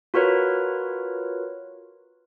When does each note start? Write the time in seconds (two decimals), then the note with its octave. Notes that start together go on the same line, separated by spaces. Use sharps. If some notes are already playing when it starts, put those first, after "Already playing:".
0.14 F4 F#4 A#4 B4 C#5